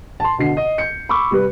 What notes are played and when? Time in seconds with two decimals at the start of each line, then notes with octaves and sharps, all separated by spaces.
0.20 A5 C6
0.38 B2 D3 C7
0.57 D#5
0.78 G6 C#7
1.09 B5 C#6 D6 E6
1.31 C3 G3 B4